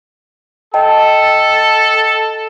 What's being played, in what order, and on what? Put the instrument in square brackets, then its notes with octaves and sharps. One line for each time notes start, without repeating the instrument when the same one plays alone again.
[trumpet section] A4 [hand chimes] D#5 G5 A5